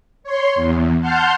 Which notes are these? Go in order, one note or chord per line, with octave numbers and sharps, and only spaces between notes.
C#5 C6
E2
F#5 A5 C6 F6 G6